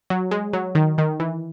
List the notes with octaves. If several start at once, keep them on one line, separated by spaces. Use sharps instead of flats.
F#3
G#3
F#3
D#3
D#3
E3